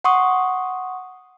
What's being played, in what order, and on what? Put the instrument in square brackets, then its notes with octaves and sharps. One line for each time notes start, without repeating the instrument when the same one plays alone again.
[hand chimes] F#5 C6 C#6 D#6